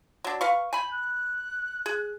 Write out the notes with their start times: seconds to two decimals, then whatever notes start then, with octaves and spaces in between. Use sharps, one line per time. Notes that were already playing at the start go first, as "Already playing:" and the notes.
0.24 F#3 D4
0.41 B4 F5 C#6
0.73 G#5 B5 G6
0.91 F#6
1.86 G#4